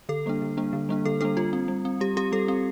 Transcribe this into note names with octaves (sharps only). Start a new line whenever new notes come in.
D3 A4
G3 A#3 D4
D3
G3 A#3 D4
D3
G3 A#3 D4
D3 A4
G3 A#3 D4 A4
G3 F4
C4
G3
C4
G3 G4
C4 G4
G3 A4
C4